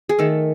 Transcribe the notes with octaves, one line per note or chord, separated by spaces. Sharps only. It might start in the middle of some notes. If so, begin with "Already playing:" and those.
G#4
D#3 A3 A4